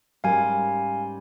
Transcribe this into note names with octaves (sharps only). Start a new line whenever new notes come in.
G#2 G3 C#4 G4 A#4 F5 G#5